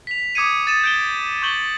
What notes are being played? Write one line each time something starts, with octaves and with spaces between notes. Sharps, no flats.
B6 F7
D6 D#6 G#6 C#7 D#7
D#6 A6 D#7 E7
G6 D7 G7
C#6 G6 F#7 G7